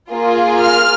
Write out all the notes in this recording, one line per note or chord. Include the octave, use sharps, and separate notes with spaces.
A#3 F4 G#4
F6